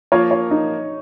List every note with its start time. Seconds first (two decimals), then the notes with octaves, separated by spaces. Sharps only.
0.12 F3 A#3 F4 A#4 C#5
0.31 C#5
0.51 D#4